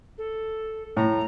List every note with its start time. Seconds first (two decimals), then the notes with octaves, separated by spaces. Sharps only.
0.18 A4
0.97 A2 A#5